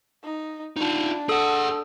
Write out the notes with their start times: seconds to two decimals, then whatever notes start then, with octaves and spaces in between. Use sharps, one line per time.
0.23 D#4
0.76 D4 D#4 F4
1.29 G#4 A4 F#5 D#6 E6